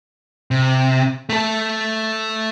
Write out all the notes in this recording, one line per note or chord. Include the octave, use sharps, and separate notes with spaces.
C3
A3 A4